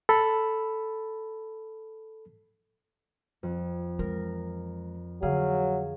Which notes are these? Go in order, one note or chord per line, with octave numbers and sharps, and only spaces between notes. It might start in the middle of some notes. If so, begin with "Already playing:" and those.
A4 B5
F2
E3 G#3 A#4
D3 F#3 G#4 F5